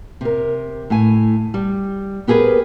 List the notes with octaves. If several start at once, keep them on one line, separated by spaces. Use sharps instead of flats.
C3 A#4
A2 G#5
G3
B3 G4 G#4 A#4 B4